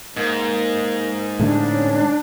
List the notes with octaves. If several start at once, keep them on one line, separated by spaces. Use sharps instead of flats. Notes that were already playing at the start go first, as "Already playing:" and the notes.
G#2 A#3
A2 D3 G#3 D4
C#4